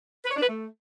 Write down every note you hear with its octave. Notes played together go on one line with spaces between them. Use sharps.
B4
C#5
D4
B4
A3